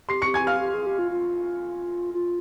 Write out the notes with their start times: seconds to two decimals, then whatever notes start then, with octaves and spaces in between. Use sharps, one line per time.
0.09 G4 C6 C7
0.22 G4 C#6 C#7
0.34 G#5 G#6
0.43 G4 F5 F6
0.61 G4
0.74 G#4
0.86 G4
0.99 F4
1.11 F4
2.14 F4